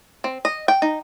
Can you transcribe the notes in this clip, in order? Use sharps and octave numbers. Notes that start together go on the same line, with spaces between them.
C4
D#5
G5
D#4